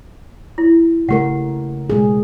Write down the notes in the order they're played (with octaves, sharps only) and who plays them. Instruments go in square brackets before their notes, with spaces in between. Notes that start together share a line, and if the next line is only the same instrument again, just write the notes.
[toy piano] E4
[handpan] C#3 A3 A#4 [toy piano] G4 F#5
[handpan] B2 G#3 G#4